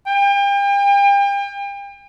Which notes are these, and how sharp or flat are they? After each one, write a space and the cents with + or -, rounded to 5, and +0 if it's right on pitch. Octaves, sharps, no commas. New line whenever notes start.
G5 +40